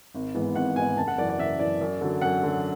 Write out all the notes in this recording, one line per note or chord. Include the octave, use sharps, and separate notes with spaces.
G#1
G#2 E3 B3
G#1 F#5
G#2 E3 B3 G#5
F#1 A5
F#5
F#2 E3 D5
D5
F#1 E5
F#2 E3 D5
F#2
D3 F#3
F#2 F#5
D3 F#3